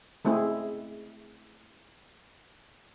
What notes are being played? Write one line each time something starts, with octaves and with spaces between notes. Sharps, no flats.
G#3 A3 C4 E4 G#4